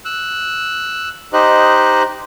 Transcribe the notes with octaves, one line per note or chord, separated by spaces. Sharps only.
E6 F#6
D#4 G4 C5 D#5 F#6